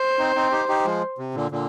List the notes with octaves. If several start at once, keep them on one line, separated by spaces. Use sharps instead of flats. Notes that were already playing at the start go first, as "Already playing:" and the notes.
Already playing: C5
C4 D#4
C4 D#4
D#4 G4
D#4 G4
F3 G#3
C3
A#2 D3
A#2 D3